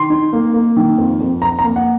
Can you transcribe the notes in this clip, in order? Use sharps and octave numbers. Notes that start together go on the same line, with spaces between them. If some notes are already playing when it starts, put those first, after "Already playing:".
Already playing: D#3 C6
D#4
A#3
A#3
D#3
F2
F2
F2 A#5
A#5
A#3
F#5